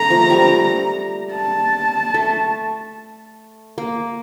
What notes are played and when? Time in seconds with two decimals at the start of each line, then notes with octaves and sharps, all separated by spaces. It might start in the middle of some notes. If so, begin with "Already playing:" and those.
Already playing: A3 A#5
0.10 F3
0.30 G3
1.32 A5
2.14 A3
3.78 A#3